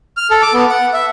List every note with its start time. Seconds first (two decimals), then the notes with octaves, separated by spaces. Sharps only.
0.17 F6
0.31 A4
0.42 D6
0.53 B3
0.69 F#5
0.93 E5